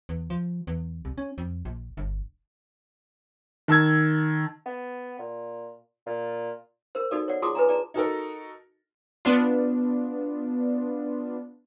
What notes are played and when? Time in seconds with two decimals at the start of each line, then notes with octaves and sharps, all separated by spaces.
0.09 E2
0.30 F3
0.67 E2
1.05 C2
1.18 C#4
1.38 F2
1.65 A#1
1.97 G1
3.68 D#3 A5 E6 G#6
4.66 B3
5.19 A#2
6.06 A#2
6.95 A#4 C5
7.11 D#4 F#4 A4 D5
7.28 C#5 D5 F#5
7.42 F4 G#4 A5 C6 D6 D#6
7.55 B4 G#5 A#5
7.69 D5 A5 A#5
7.94 D#4 F#4 A4 A#4
9.25 B3 D4 F4